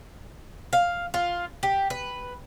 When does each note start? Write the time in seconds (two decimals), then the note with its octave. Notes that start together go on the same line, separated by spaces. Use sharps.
0.73 F5
1.14 F4
1.63 G4
1.90 B4